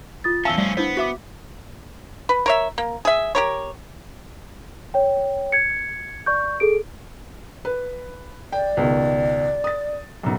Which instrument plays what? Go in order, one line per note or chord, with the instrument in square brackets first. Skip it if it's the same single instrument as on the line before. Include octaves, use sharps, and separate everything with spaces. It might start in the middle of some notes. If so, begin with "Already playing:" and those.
[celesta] F4 D#6 A6
[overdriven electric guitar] E2 C#4 [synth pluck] E5 G#5 A5 [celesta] F5 E6 G7
[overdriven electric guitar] F3 C#4 [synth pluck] G3 A3
[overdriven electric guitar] B3 [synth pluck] D4 E4 C5
[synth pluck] F#4 E5 D6 [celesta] B6
[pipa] B4
A#4 C#5 E5
A#3
G#4 E5
G4 A#4 C#5
[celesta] C#5 G5
G#6 C#7
D5 C#6 G6
G#4 A4 D7
[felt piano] B4
[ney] D5 [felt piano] G5
[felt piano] C#2 B2 D#3
D#6 A6
B1 F#2